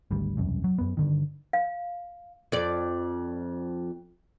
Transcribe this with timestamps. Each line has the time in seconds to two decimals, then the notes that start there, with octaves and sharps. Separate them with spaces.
0.11 G#1 D2 G3
0.37 E1 C2 F#2
0.64 F#3
0.78 F#2 B3
0.97 G2 D3 D#3
1.53 F5
2.52 F2 D5